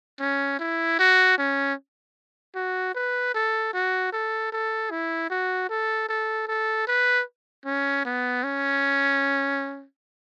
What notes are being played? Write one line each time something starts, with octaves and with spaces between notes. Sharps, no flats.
C#4
E4
F#4
C#4
F#4
B4
A4
F#4
A4
A4
E4
F#4
A4
A4
A4
B4
C#4
B3
C#4